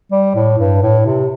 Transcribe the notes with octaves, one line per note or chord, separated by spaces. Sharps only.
G3
A2
G2
A2
C3